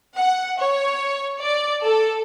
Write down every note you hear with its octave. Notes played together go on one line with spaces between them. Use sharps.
F#5
C#5
D5
A4